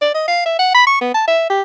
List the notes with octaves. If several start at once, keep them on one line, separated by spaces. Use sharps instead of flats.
D5
D#5
F5
E5
F#5
B5
C#6
B3
A5
E5
G4